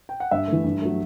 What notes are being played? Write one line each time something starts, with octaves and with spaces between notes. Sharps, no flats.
G5
F#5
G2 E5
E3 A3
G2
F#3 A3